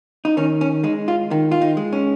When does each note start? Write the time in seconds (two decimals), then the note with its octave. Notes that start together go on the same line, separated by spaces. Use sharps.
0.25 D#4
0.37 D#3 C#4
0.61 C#4
0.84 G#3 D#4
1.08 F4
1.31 D#3
1.52 F4
1.61 D#4
1.77 G#3
1.93 C#4